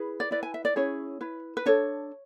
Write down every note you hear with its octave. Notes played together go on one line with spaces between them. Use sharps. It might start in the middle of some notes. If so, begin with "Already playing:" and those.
Already playing: E4 G#4 B4
D5
E4 B4 D5
G#5
E5
D5
C#4 E4 G#4 C#5
E4 B4
B4
D4 A4 C#5